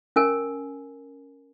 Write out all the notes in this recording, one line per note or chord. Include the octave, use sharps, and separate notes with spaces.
C#4 A#4 G#5